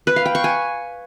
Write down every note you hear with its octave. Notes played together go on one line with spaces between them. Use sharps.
B4
F5
G5
C#6
G#5